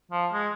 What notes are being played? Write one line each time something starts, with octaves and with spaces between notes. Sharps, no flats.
F3
G#3